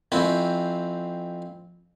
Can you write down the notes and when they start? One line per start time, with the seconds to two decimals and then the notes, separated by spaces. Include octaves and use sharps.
0.12 F2 C4 C#4 E4